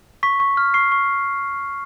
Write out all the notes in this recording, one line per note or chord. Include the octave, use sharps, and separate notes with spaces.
C#6 B6
C#6
F6
C#6 C7
C#6